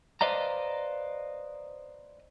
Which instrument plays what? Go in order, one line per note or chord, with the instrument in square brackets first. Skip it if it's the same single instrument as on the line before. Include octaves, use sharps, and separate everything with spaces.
[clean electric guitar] B4 C5 D5 D#5 F5 A#5